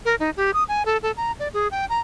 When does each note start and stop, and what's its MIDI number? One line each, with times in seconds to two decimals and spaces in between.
0.05 0.15 70
0.20 0.30 63
0.37 0.51 67
0.54 0.64 87
0.68 0.83 80
0.86 0.97 69
1.03 1.12 69
1.17 1.32 82
1.39 1.48 74
1.54 1.68 68
1.71 1.85 79
1.90 2.00 82